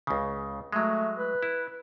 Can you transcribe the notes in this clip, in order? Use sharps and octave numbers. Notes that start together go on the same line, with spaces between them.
C#2 C#3
F#3 G#3 A3
B4
E4